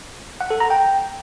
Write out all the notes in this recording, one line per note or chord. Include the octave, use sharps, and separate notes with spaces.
F#5
A4
A#5
G5